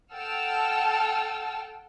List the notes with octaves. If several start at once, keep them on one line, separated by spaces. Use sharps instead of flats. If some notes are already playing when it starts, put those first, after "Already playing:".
A4 F#5 G5 A5 E6 F6